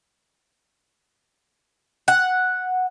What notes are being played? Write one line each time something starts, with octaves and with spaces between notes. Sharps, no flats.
F#5